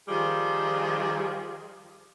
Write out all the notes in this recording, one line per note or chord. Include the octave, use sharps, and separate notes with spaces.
D#3 F3 G3 G#4